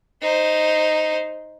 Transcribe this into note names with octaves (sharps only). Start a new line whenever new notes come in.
D#4 C5